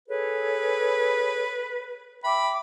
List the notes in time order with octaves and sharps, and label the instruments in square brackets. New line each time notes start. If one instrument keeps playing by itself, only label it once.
[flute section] G#4 A4 C#5 [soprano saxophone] B4
[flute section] E5 G5 D6 [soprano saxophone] B5